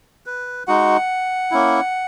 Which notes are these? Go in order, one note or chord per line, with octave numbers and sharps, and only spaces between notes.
B4
G#3 D#4 F#4 F#5
A#3 C#4 E4